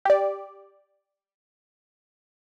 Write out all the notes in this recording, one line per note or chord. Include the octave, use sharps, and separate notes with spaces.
G4 D5